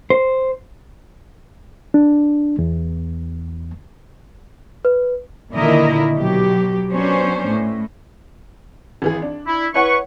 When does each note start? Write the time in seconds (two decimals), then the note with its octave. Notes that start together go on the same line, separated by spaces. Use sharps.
0.10 C5
1.94 D4
2.59 E2
4.85 B4
5.54 A#2 D3 D#3 E4 A#4 D#5
6.14 B2 F#3 G4
6.92 F#3 B3 C#4 D4 C5
7.48 A2
9.02 G#1 E3 G#4
9.22 D4
9.46 E4
9.74 E4 B4 C#5 F#5 C#6